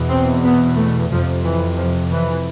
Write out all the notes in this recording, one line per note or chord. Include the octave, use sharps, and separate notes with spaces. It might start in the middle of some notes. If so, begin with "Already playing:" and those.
Already playing: E2 B2
C4
B3
A3
F2 C3 F3
E3
F3
E3